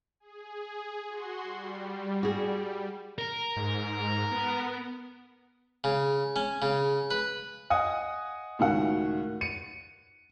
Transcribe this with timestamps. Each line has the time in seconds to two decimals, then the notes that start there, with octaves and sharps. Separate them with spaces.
0.20 G#4
1.09 F#4 C6
1.43 G3
2.23 F#4 G#4
3.19 A#4
3.57 G#2
4.32 B3
5.84 C#3
6.36 C#4
6.62 C#3
7.11 B4
7.70 D#5 F#5 G#5 D#6
8.59 C#2 A2 D#3 F#4 F#5
9.41 C#7 D#7